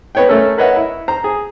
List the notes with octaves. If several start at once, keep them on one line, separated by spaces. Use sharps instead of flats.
B3 B4 C#5 D#5 G5
A3 C#4 A4 A#4
A#4 B4 C#5 D#5 E5 F#5
E4
C5 A#5
G#4